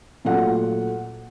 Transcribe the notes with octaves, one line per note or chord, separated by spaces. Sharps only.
A#2 F#3 A3 F#5